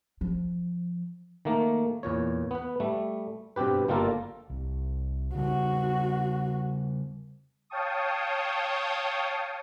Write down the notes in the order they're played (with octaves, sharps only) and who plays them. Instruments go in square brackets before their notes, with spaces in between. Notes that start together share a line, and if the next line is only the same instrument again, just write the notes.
[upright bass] F3
[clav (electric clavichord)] D#3 A3 A#3
E2 A#2 C#5
B3 B4
G3 A3
G2 B2 C4 G4 B4
G1 G3 A#3 F4 A4 A#4
[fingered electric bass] C2
[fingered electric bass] C#3 G3 [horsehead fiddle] F#4
[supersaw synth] C#5 F5 G5 A5 C#6 D#6